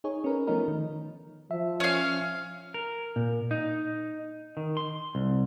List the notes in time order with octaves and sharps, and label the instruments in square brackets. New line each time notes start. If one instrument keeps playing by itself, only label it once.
[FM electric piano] D#4 G#4 C#5
C#4 A#4 B4
F3 A3 B3 C#4 D#4 A#4
D#3
[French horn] F3 [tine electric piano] E5
[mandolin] C#4 F5
[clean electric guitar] A#4
A#2
D#4
D#3
C6
C2